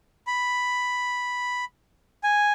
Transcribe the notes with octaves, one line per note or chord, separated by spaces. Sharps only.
B5
G#5